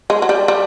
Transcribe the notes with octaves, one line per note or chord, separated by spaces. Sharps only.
G#3
F#3
G3
G3